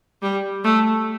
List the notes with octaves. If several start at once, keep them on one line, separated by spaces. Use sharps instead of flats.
G3
A3